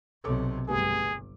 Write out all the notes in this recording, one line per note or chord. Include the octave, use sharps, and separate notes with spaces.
B1 C3 A4 C#5 D6
G1 G2 G3 A3 B3 G#4